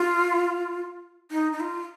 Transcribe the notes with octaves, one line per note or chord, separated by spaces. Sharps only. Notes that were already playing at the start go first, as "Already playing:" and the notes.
Already playing: F4
D#4
D#4
F4